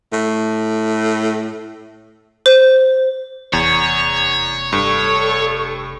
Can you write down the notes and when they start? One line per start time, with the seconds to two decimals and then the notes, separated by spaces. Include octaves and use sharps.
0.13 A2
2.46 C5
3.53 F1 E2 C#5
4.73 G2 A4 C#6